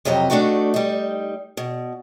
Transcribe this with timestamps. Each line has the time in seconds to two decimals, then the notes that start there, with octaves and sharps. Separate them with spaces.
0.05 F2 C3 F#3 G4 D#5
0.30 A3 D4 D#4 F#4 A4
0.74 G3 D#4
1.57 B2